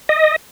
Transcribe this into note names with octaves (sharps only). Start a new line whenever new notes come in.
D#5